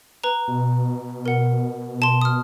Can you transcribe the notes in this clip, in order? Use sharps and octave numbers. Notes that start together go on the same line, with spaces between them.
B4 A#5
B2
A#4 F#5
A5 C6
D#6 F6